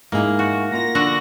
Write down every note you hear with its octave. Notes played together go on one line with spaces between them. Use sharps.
G#2 A#3 E4 G#4
F#4
A#3 F4 A#6
D3 F#4 F#5